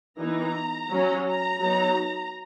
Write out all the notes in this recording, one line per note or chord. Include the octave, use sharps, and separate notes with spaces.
E3 B3 D#4 A#5
F#3 C#4
A#5
F#3 B3 D#4